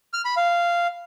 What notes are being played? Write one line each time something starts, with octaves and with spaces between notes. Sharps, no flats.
F6
B5
F5